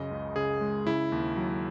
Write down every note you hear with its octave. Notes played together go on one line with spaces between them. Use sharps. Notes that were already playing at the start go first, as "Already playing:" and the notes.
Already playing: F#2 C#3 D#5
C#2
C#3 G#4
G#3
C#3 E4
D#2
F#3